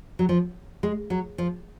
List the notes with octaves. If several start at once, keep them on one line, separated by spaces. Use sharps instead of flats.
F#3
F3
G#3
F#3
F3